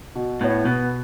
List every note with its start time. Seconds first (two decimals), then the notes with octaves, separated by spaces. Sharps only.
0.15 B2
0.41 A2 B3 E4 C#5
0.65 B2 B3